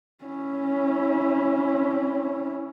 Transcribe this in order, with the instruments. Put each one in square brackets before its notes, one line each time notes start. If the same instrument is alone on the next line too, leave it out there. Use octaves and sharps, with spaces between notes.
[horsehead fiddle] C#4 E4